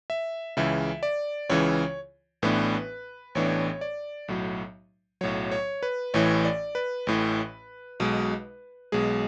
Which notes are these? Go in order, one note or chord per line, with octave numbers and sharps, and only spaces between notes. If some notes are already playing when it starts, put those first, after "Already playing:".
E5
C#2 C#3 E3 E5
D5
C#2 C#3 E3 C#5
A1 A2 E3 B3 D4 B4
A1 A2 E3 B3 D4 C#5
D5
B1 A2 F#3
B1 A2 F#3 C#5
C#5
B4
A1 A2 E3 C#5
D5
B4
A1 A2 E3
B1 B2 G#3
B1 B2 G#3 G#4